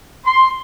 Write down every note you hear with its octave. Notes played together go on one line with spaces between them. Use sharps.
C6